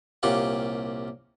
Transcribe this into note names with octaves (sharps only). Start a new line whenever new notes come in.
C2 A#2 C#4 F4 G4 F#5